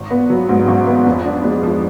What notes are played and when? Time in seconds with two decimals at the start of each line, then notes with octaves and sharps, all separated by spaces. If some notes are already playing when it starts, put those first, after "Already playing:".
Already playing: G#1
0.11 B3
0.30 F#3
0.49 G#2
0.68 G#1
0.87 B3
1.06 F2
1.26 D4
1.44 G#3
1.63 F3